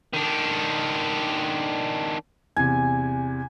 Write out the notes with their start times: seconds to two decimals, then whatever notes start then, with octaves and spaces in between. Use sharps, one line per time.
0.14 D#3 D4
2.56 E2 C3 G#5